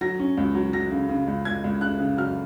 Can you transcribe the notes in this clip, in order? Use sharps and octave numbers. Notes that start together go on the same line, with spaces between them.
F#3 A#6
C#4
C#2
F#3
F#3 A#6
C#3
C#3
C#2
C#2 G#6
C#2
C#3 F#6
C#3
F#3 F6